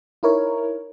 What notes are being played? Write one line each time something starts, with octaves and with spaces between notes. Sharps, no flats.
D#4 E4 A#4 C#5